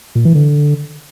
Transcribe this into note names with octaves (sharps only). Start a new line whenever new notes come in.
A#2
E3
D3